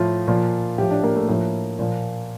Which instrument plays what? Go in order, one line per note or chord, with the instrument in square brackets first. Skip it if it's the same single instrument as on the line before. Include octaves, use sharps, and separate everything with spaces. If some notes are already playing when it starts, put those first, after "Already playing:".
Already playing: [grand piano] A2 F3 F4
A#2 F3
A2 F3 G4
D4
A#3
A3
A2 F3 A#3
A#2 F3